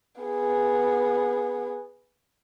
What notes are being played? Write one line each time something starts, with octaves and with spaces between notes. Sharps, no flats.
B3 G#4